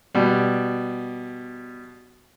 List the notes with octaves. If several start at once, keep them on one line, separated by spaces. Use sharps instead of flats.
B2 G3